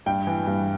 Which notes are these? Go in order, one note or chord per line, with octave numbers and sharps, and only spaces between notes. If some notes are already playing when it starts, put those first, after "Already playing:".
G2 G5
E3
G2